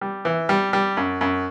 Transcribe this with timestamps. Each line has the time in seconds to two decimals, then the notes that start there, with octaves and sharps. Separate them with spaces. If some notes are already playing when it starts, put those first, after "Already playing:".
0.01 G3
0.25 E3
0.49 G3
0.73 G3
0.97 F#2
1.21 F#2